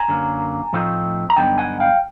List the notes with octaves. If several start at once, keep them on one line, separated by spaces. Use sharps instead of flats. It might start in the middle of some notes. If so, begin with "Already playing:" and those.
Already playing: G#5 A#5
F#2 D3 F#3 A#3
A2 F3 A3 C4 D#4
A#5
G2 D3 F#3 B3 D#4 G5 A5
F#5 G#5
F5 G5